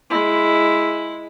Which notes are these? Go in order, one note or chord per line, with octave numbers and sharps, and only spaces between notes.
G#3 E4